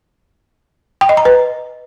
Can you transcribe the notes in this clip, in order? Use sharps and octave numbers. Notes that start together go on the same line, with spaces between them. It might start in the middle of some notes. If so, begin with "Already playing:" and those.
G5
D#5
A#5
B4